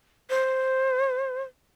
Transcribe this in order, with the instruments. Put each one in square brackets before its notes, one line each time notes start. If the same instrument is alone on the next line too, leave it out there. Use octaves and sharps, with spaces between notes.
[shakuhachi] C5